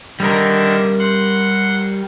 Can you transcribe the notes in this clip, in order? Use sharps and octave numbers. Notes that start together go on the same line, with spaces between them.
D3 D#3 G3 A#4
F#5 C6